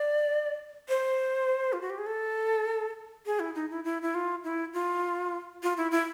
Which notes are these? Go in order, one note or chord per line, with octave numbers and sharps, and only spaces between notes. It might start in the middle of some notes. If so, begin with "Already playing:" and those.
Already playing: D5
C5
F4
F#4
G4
G#4
A4
G#4
E4
D#4
E4
E4
E4
F4
E4
F4
F4
E4
E4